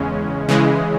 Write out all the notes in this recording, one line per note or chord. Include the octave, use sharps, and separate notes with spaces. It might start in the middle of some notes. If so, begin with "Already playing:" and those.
Already playing: E2 C#3 G#3 C#4
C#3 E3 G#3